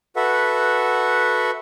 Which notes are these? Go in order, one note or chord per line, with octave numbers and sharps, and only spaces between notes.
F#4 A4 B4 E5 F#5